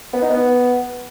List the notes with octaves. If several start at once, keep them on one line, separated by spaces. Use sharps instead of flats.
B3
D#4
B3